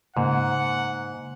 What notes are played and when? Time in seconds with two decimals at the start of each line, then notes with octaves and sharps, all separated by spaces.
0.17 G#2 C#3 A#3 F#5